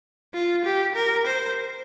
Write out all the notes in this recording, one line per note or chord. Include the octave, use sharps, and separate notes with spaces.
F4
G4
A#4
C5